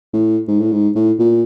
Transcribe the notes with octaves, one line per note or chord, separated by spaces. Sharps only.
A2
G#2
A2
G#2
A2
A#2